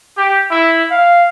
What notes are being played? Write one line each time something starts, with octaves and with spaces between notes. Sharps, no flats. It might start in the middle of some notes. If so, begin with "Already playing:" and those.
G4
E4
F5